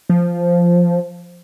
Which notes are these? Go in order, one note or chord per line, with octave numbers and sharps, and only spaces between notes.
F3